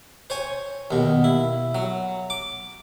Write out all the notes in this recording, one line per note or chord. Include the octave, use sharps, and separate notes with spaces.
C5 C#5 G#5
D#2 B2
E4
F#3
D6